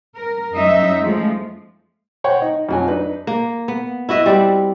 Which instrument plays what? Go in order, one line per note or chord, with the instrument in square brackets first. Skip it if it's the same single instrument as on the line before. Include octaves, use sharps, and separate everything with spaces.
[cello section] A#4
F#2 F#3 D#4 D#5 E5
F3 G#3 A3
[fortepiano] C5 C#5 F#5 G5
D#4
F2 F#3 G#5
D4 D#4 B4 D#5
[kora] A#3
B3
E4 F#4 D#5 E5
G3 C4 F#4 D5